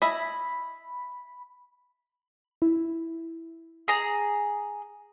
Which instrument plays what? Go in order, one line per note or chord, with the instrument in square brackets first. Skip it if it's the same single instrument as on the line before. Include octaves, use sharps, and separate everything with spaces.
[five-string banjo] E4 D#5 [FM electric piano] B5
[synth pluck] E4
[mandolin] G#4 A#5